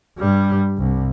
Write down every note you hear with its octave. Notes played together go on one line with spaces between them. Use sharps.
G2 G3
C2